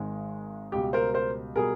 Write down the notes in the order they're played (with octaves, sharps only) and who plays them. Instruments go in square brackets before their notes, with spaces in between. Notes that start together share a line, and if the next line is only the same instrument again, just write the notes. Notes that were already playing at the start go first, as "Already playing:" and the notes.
Already playing: [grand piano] G#1 G#2 D#3 G#3
C#2 B2 G3 G4
A#4 C5
A#4 C5
B2 G3 G#4 A#4